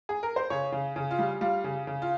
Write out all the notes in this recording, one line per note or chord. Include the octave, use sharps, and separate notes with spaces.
G#4
A#4
C5
C#3 C#5
C#3
C#3
F4
G3
G3 F4
C#3
C#3
F4